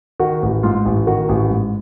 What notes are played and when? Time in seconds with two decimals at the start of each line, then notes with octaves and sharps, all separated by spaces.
0.20 D#3 F#4
0.42 A1
0.63 G#2 F4
0.85 A1
1.07 D#3 F#4
1.29 A1
1.51 G#2